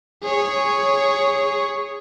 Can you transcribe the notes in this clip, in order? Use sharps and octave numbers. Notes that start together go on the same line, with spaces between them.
G#4 C#5